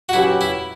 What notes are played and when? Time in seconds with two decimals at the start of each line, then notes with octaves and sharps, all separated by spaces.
0.09 F#4
0.13 F#3 C#4 E4 G4 B4
0.41 E4